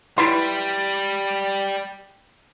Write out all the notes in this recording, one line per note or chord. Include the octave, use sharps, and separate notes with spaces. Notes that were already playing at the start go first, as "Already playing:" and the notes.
G3 E4 B4 C6